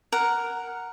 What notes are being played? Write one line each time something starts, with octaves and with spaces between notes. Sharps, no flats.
A#4 F#5